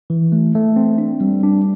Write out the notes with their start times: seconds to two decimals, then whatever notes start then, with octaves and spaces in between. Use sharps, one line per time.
0.10 E3
0.32 A3
0.55 A3
0.76 C4
0.98 D4
1.21 G3
1.43 D4